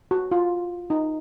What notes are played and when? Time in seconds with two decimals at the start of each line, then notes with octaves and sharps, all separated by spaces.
0.11 F#4
0.31 F4
0.90 D#4